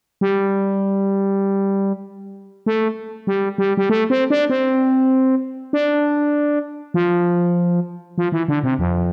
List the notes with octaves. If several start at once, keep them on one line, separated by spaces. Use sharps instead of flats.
G3
A3
G3
G3
G3
A3
C4
D4
C4
D4
F3
F3
E3
D3
C3
F2